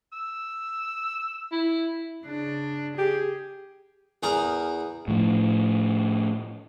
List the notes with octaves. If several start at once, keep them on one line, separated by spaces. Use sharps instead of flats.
E6
E4
C#3 D4
G4 G#4
E2 G#4 A#4 A#5
A2 F3